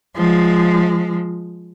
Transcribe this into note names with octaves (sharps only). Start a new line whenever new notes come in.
F3 G#3